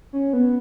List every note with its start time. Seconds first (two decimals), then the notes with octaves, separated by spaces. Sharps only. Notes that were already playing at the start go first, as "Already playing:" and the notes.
0.13 C#4
0.33 B3